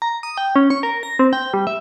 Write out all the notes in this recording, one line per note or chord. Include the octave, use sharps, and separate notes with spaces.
A#5
D#6
G5
C#4
C#6
A#4
A#6
C4
G5
G3
E5